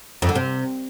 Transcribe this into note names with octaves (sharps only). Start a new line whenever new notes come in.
F2
D3
C3